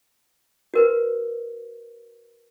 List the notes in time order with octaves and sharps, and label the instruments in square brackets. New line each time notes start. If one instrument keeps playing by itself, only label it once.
[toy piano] F#4 A#4 B4